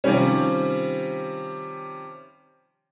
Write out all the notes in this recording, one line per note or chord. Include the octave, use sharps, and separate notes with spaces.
C3 D#3 F3 G3 C#4